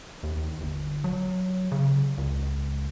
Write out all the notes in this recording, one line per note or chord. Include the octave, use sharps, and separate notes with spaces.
D#2
G1
F#3
C#3
C#2